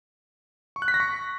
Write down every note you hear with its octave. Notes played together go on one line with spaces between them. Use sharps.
C#6
F#6
B6
A#6
C#6